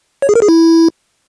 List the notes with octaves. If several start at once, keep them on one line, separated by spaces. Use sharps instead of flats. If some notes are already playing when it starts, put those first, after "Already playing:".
C#5
G#4
A#4
G#4
E4